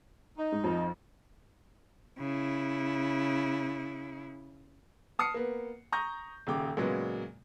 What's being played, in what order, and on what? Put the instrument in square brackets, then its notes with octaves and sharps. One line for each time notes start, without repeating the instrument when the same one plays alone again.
[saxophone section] D#4
[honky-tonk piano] G#2
F2 F3
[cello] C#3 E4
[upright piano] A5 D#6 F6 C7 C#7
A#3 B3
A#5 C#6 D#6 G6 A#6
D#1 C#3 G5 D6
A#2 C#3 F#3 G#3 B3